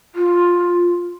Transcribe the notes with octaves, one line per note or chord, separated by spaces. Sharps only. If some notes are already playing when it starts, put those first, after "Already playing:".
F4